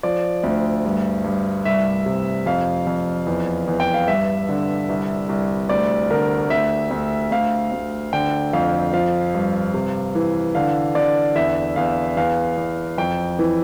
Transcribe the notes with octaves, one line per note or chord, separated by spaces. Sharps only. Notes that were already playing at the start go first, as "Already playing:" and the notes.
F3 D5
D2
G2
G2
C2 E5
C3
F2 F5
F2
E2
E2
G5
F5
G2 E5
D3
C2
C2
D2 D5
D3 A#4
D2 E5
D2
D2 F5
D2
D3 G5
F2 F5
F3 F5
G2
C3
E3
D3 F5
D3 D5
E2 E5
E2 F5
E2 F5
E2
F2 G5
E3